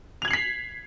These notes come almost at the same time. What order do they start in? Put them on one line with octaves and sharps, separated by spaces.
F7 G#6 F#7 C7 B6